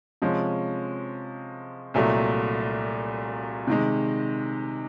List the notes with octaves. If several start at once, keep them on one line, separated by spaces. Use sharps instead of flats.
C3 F3 G#3 C#4
C2 A#2 F#3 A3
C3 D#3 G#3